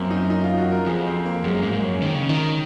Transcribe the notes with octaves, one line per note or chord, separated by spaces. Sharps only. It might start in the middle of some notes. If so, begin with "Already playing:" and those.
Already playing: F#2 A#3 C4
D#4
D#4
F4
F#4
A#4
F2 G#4
C4
A#3
F#2 G#3
G#2 A#3
G#2
F#2 C#4
D#3 C#4
C#3
D#3 D#4